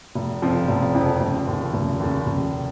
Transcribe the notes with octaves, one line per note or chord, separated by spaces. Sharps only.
F1
F2 C#3 F3 C4
F1
F2 C#3 F3 C4
F1
D#2 C#3
F1
D#2 C#3
F1